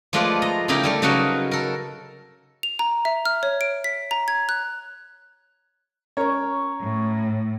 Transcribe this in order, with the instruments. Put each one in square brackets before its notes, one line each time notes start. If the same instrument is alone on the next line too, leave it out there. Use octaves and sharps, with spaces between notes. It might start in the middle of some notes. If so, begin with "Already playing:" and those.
[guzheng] F3 G#3 A3 F4 B4 D5
D#5 A#5
C#3 A3 D#4 E4 G4 A#4
G3 A3 A4
C#3 F#3 D#4 F#4 A#4 B4
A4 A#4
[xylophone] F7
A#5
E5
F6
C#5
D7
B6
A#5
G#6
F#6
[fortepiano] C#4 A#4 C#5 [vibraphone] A#5 C#6
[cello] A2